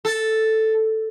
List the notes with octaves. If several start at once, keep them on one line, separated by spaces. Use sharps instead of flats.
A4